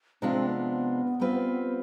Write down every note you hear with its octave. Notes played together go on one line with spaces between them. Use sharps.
C3 F3 G#3 C4 D4 F4
B3
G3 C4 F4 B4